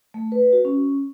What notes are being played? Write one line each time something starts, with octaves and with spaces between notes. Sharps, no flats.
A3
B4
F#4
C#4